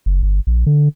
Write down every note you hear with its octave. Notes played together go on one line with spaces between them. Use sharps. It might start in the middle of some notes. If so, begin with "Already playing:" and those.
F#1
G1
A#1
D3